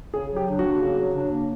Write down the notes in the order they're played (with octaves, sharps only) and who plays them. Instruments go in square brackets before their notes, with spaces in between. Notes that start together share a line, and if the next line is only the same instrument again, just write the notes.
[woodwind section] C#3 [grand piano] G#4
[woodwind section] F#3
[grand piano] G4
[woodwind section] D4
[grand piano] F#4
[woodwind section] A#3
C#3
F#3
D4
A#3